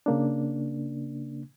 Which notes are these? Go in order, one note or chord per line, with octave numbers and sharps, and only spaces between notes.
C#3 A#3 D4